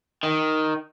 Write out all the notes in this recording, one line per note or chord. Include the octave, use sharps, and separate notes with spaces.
D#3